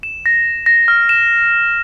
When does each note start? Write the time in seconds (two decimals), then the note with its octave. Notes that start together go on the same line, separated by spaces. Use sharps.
0.03 E7
0.26 A#6
0.66 A#6
0.88 F6
1.09 E7